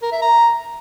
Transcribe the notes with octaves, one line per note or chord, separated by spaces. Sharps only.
A#4
E5
A#5